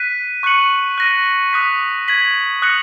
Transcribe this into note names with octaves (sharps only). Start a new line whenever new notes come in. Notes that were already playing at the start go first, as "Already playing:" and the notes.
Already playing: F#6 B6 D#7
C#6 F#6 C#7 F#7
F#6 A#6 D#7
D#6 F#6 B6
G#6 B6 F#7
D#6 F#6 A#6 C#7 F#7